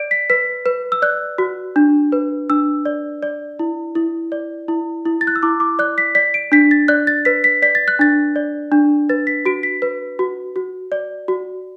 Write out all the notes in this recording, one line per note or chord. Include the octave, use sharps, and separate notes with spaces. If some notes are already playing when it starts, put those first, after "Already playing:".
Already playing: D5 D7
B6
B4 B6
B4
E6
D5 F#6
F#4
D4
B4
D4 E6
D5
D5
E4
E4
D5
E4
E4
A6
F#6
E6
E4 D6
D6
D5 F#6
B6
D5 B6
D7
D4 B6
A6
D5 F#6
A6
B4 B6
B6
D5 B6
A6
F#6
D4 A6
D5
D4
B4 A6
B6
F#4 D7
B6
B4
F#4
F#4
D5
F#4